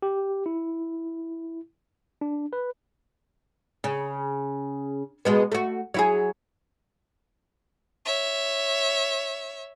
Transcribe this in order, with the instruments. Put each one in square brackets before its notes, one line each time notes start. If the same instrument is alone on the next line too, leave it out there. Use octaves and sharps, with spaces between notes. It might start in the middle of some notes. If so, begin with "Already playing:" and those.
[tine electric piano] G4
E4
D4
B4
[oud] C#3
B2 G#3 B3
A3 F#4
F#3 E4 G#4
[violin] C#5 E5